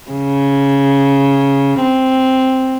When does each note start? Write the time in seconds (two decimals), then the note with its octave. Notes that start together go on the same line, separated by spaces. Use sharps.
0.10 C#3
1.80 C4